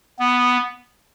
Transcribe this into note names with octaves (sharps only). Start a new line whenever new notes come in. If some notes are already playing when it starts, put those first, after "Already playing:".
B3